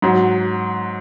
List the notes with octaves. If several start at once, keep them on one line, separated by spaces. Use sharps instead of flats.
G#2 F#3